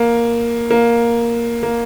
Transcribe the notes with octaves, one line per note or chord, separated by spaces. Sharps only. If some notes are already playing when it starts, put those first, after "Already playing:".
Already playing: A#3
A#3
A#3